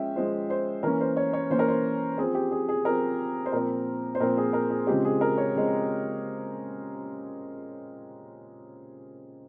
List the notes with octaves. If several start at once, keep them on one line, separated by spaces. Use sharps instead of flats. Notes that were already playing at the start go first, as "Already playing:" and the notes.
Already playing: F3 G#3 C#4 E5 G5
F3 G#3 C#4 C5
C5
E3 A#3 C#4 A#4
C5
C#5
C#5
E3 A#3 C#4 C5
A#4
C5
F3 C4 G#4
G4
G#4
G#4
F3 C4 A#4
C5
A#2 F3 C4 A#4
C5
A#2 F3 C4 A#4
G#4
A#4
G#4
C#3 F3 G#3 C4 G4
G#4
A#4
C#5
C#3 F3 G#3 C4